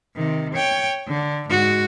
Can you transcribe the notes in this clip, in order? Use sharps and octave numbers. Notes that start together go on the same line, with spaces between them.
C3 D#3
C#5 G5
D3
G#2 F#4